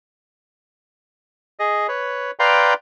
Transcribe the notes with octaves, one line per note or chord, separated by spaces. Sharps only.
G#4 D#5
B4 C#5
B4 D5 F5 G5 A#5 C6